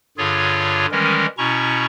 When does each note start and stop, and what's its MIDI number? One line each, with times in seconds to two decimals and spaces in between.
0.18 0.86 43
0.18 0.86 50
0.18 0.86 65
0.18 0.86 68
0.18 0.86 73
0.91 1.26 51
0.91 1.26 52
0.91 1.26 55
0.91 1.26 56
0.91 1.26 61
0.91 1.26 70
1.38 1.86 47
1.38 1.86 61
1.38 1.86 64
1.38 1.86 82
1.38 1.86 85